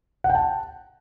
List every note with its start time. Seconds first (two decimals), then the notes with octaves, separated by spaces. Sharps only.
0.24 F#5
0.30 G5
0.35 A5